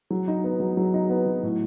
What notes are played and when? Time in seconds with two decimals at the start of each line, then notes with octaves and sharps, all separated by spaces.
0.10 F#3
0.28 D#4
0.44 B3
0.60 F#3
0.77 F#3
0.94 D#4
1.10 B3
1.26 F#3
1.43 A2